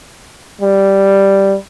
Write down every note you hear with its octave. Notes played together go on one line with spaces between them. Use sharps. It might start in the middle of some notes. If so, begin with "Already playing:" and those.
G3